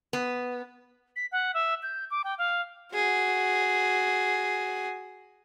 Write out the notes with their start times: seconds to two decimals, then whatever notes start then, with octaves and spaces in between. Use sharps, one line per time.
0.13 B3
1.16 B6
1.32 F#5
1.54 E5
1.83 G6
2.11 D6
2.24 G5
2.38 F5
2.94 F#4 G#4